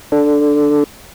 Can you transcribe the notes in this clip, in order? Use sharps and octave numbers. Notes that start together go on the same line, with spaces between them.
D4 A4